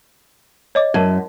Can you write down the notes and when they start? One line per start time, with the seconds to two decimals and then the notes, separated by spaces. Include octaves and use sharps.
0.75 C#5 D#5 D6
0.94 F#2 A#4 A5 G#6